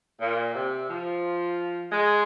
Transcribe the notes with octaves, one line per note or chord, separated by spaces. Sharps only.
A#2
C3
F3
G#3